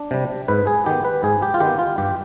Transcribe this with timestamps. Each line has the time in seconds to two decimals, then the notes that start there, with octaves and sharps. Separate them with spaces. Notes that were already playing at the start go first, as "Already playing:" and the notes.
Already playing: D4
0.11 C3 G3
0.48 G#2 B4
0.67 G#4
0.86 D#3 B3 G4
1.05 B4
1.23 G#2 G#4
1.42 G4
1.54 F4
1.60 D#3 B3 G4
1.79 F4
1.98 G2 G4